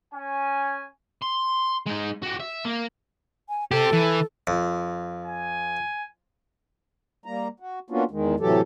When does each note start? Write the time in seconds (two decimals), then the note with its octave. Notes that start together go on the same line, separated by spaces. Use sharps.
0.14 C#4 G#5
1.22 C6
1.86 G#3 D#4
2.22 F#4 G4
2.40 E5
2.65 A#3
3.49 G#5
3.71 G4 A4 C5
3.93 E3
4.47 F2
5.25 G#5
7.26 G3 A#3 A#5
7.60 F#4
7.90 A#3 B3 C#4 D4 F4 F#4
8.11 E2 D#3 G#3
8.40 A2 C3 E3 F#3 G4 A4